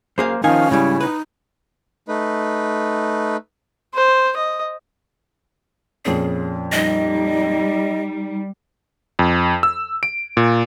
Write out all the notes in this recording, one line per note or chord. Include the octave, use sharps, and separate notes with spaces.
F#2 A#3 G#4 C5 F5
D#3 F3 C#4 D#4 F5 G#5
G#2 C#3 G3 E4
D#4 B4
A3 D#4 B4
C5
D#5
F2 A#2 C#4 G#4
G3 D#4 D#5
F2
E6
D7
A#2